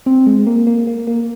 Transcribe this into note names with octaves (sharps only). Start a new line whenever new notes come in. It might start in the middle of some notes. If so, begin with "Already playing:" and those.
C4
G#3
A#3
A#3
A#3
A#3